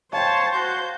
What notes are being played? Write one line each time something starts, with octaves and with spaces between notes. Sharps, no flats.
C5 C#5 F5 G5 A5
F#4 G6